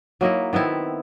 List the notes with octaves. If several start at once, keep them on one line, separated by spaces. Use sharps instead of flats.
F#3 A#3 D#4 E4
D#3 B3 C4 E4